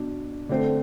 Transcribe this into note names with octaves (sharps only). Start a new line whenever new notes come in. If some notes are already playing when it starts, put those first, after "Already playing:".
Already playing: B2 D4
D3 A3 C4